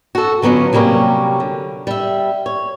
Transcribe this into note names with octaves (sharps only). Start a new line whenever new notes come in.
F#4 A4
D3 F#3 B3 C#4 F4
C3 F#3 G3 A#3 C#4
D3
G3 E5
C#5